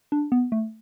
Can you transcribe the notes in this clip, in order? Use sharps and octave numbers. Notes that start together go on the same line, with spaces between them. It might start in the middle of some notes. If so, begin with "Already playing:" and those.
D4
B3
A3